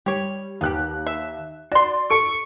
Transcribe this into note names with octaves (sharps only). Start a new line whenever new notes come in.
G3 G4 C#5
D#2 B3 G4 F#6
E5
F#4 D5 C6
A4 C#6 D7